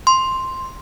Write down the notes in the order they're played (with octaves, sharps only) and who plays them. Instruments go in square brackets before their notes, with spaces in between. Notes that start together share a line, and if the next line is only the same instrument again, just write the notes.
[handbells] C6